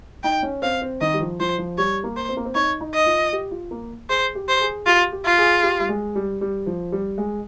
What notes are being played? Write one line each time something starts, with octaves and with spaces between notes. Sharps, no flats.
D#4 G5
C#4
C4 F5
C4
D#3 D#5
G3
F3
F3 C5
F3
G3 C#5
A#3
C5
C4
A#3
C4
D#4 C#5
D#4
D#5
F4
G4
F4
A#3
G#4 C5
G4
C5
G#4
F4 G4
G4
F4
G#4
G4
G3
G#3
G3
G3
F3
G3
G#3